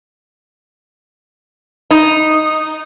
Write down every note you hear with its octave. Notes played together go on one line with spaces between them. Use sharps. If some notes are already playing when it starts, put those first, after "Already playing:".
D#4